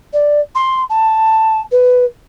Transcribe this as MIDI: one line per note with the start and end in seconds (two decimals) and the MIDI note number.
0.13 0.40 74
0.55 0.82 84
0.89 1.60 81
1.71 2.05 71